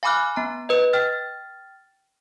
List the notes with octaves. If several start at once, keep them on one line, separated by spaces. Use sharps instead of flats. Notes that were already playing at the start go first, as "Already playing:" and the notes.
F5 G#5 B5 D6 F6 F#6
B3 A#5
B4 D#5
G5 F6 A6